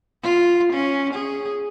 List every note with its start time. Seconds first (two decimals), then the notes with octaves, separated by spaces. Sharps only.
0.23 F4
0.73 C#4
1.13 G#4